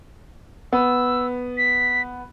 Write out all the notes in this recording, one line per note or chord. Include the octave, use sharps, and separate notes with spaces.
B3 E6
B6